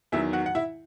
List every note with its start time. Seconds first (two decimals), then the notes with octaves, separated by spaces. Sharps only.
0.12 E2 D#3 F#3 E4 E5
0.33 F#4 F#5
0.46 F#5
0.55 E4 E5